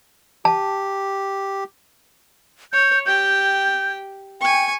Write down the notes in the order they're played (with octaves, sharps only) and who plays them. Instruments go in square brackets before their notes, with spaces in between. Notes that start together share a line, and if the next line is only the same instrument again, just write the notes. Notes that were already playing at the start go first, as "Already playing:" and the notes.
[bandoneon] G4 [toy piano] A5
[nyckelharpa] C#5 [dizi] G6
[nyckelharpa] G4 G5 [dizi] G6
[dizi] G5 [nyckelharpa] G#5 C#6